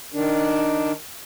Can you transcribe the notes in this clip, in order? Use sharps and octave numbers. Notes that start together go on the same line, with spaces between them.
D#3 D4